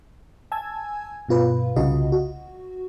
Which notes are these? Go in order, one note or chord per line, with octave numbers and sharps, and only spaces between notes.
G#5 A5 E6 G#6
G2 B2 F4 B4
C2 C#3 F4 F#4 D#5
F#4